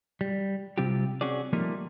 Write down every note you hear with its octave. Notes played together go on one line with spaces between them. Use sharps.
G3
C3 G3 C4 F4 G4
C4 C#4 F#4 G#4 D5
F3 G3 A3 A#3 D#4